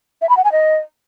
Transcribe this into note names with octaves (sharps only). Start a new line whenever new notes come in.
E5
B5
F#5
G#5
D#5